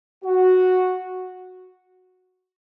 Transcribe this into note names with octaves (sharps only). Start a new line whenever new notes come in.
F#4